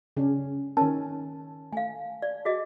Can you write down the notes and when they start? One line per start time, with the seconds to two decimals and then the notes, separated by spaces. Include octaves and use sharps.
0.17 C#3 C#4 D4
0.77 D#3 C#4 A#4 A5
1.73 A3 F5 G#5
2.22 D5
2.45 F#4 G#4 D#5